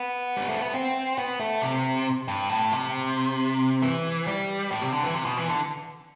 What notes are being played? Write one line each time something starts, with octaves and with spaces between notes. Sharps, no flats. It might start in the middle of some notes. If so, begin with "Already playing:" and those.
Already playing: B3
G3
A3
B3
C4
B3
A3
C3
G2
A2
C3
E3
G3
A2
C3
D3
E3
C3
B2
E3
D3